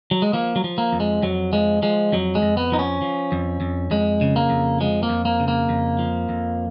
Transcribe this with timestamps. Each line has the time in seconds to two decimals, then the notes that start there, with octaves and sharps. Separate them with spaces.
0.11 F#3
0.22 G#3
0.33 F3 A#3
0.56 F#3
0.64 F3
0.78 A#3
0.92 F2
1.00 G#3
1.22 F2 F#3
1.53 F3 G#3
1.82 F3 G#3
2.12 F2 F#3
2.35 G#3
2.42 F2
2.57 B3
2.72 F3 D#4
2.79 C#4
3.02 F3
3.32 F2
3.61 F2
3.91 F2 G#3
4.21 C#3
4.36 A#3
4.50 F2
4.80 F3 G#3
5.03 A#3
5.10 F2
5.25 A#3
5.40 C#3
5.48 A#3
5.69 F2
5.99 F3
6.29 F2